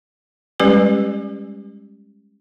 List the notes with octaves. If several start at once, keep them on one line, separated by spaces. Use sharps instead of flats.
G3 G#3 C#4 G4 B4 D5